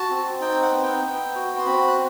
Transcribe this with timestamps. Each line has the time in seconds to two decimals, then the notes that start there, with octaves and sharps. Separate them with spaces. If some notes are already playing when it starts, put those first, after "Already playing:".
Already playing: F#4 A5
0.10 C4
0.41 D#4 G5
0.62 F#5
0.72 B3
0.83 G5
1.04 B3
1.35 F#4
1.58 C6
1.66 C4 B5
1.88 F#6